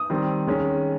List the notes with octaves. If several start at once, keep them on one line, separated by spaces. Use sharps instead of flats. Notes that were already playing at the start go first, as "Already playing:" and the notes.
Already playing: D#6
D#3 G3 C4
D#3 G#3 C#4